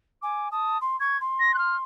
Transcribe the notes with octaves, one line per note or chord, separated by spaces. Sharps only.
G#5 D6
A5 D#6
C6
C#6 G#6
C6
A#6
F#6
F6